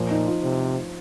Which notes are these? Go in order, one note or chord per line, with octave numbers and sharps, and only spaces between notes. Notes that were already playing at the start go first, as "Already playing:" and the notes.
Already playing: A#2 F3
D#4
F4
C3